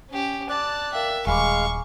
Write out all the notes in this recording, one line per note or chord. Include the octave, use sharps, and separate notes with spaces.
C#4 G4
D5 A5 D6 F#6
A#4 E5 F5 G5
D#1 G#3 F5 G#5 B5 C#6 D6